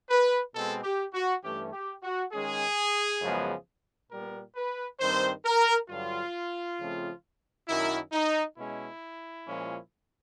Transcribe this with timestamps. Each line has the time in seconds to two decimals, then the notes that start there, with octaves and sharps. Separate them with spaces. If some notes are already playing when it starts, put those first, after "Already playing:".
0.10 B4
0.54 B2 G#3 C4 A4
0.84 G4
1.14 F#4
1.43 G2 E3 A3 C#4 G4
1.73 G4
2.03 F#4
2.33 D#3 G#3 C#4 G#4
3.21 F#2 C#3 F3 G#3 B3
4.11 A#2 G3 B3 A#4
4.55 B4
5.00 G2 D#3 G3 C4 C5
5.45 A#4
5.89 G2 D3 F#3 F4
6.79 C#3 F3 A3 C4
7.68 F#2 D#3 F#3 E4
8.12 D#4
8.57 B2 G#3 C#4 E4
9.46 A#2 F3 G#3 C#4